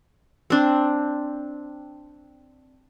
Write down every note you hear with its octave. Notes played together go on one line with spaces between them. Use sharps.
C4 D4